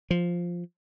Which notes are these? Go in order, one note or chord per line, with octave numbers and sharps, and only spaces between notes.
F3